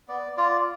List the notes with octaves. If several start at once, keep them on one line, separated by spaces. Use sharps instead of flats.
B3 D5
F4 D5